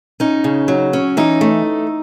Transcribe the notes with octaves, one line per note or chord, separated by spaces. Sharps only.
C#4 D#4
C#3
F#3
C#4
E3 D#4
A3